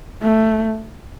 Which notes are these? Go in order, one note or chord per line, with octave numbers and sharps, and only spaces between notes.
A3